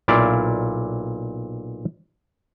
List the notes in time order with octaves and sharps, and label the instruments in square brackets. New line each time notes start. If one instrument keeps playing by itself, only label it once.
[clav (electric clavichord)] B1 A#2 E4 D5 F5